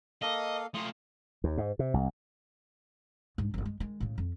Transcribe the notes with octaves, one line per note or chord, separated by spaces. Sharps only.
A#3 A4 D#5 F5
A3 F4 C6 D#6
D#2
G#2
C3
C2
G#2 D4
G1 E2
G#3
D#3 G#3
A2 C#3
F2